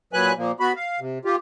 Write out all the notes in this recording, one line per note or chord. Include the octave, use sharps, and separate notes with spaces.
A#2 F#3 B4 G#5 F#6
A#2 F3 A#3
B3 F#4 B5
F5
C3
F4 G4